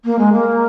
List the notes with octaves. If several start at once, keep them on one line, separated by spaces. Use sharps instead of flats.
A#3
G#3
A#3